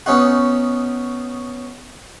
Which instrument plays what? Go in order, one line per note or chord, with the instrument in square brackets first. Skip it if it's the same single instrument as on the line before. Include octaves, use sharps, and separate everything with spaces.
[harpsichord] B3 C#4 D#4 F#4